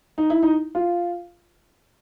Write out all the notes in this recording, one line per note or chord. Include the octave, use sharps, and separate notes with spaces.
D#4
E4
D#4
F4